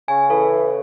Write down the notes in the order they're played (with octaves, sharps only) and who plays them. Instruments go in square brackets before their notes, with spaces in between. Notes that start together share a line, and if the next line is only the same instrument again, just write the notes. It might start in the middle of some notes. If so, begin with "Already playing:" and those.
[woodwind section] C#3 [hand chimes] G#5
[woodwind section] E3 [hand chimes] A4
[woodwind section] C#3